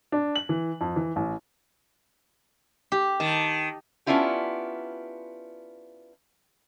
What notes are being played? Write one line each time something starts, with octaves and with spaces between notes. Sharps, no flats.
D4
F#7
E3
F2
E3
A1
G4
D#3 A5
B3 C#4 D4 E4 F4 G4